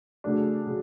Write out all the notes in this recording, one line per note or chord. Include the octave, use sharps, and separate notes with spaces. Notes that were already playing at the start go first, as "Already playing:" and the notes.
C#3 F#3 A3 D4
C#3 F#3